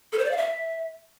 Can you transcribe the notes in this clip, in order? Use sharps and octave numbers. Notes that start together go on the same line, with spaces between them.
A4
C5
D5
F5
E5